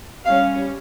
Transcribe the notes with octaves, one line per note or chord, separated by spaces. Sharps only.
G3 C#4 F5